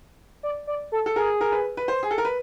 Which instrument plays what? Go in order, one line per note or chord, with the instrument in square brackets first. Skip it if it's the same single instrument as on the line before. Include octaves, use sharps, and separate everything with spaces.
[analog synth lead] D5
D5
A4
[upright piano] A4
[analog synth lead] G#4 [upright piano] A#4
[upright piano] A#4
B4
B4
C5
G#4
A4
A#4
B4